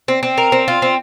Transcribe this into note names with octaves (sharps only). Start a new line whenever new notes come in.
C4
C4
A#4
C4
F4
C4